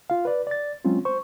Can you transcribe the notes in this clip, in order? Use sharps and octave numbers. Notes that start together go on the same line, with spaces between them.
F4 F5
B4 D5
D5 A6
F#3 G#3 C4 C#4 F4
C5 C#6